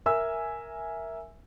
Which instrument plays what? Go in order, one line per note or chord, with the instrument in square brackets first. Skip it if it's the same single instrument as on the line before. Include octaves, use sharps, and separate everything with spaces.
[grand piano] A#4 E5 G#5 E6